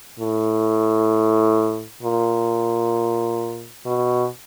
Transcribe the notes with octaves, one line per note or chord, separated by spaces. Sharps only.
A2
A#2
B2